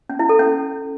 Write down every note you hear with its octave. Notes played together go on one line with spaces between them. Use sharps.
C#4
E4
A4
C#4